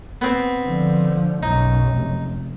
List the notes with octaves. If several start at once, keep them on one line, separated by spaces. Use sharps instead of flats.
B3 C4
D3 F3
B1 F#2 D#4
F1